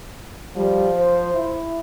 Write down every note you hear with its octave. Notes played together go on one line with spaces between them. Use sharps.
F3 G3
C5
E4